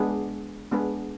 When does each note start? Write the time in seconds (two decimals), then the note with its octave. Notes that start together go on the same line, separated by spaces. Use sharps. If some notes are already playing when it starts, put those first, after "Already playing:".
Already playing: G#3 B3 D4 G#4 B4
0.71 G#3 B3 D4 G#4 B4